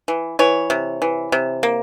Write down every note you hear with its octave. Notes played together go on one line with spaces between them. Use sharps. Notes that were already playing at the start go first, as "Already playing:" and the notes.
E3
E3 C#5
C3
E3
C3
A#3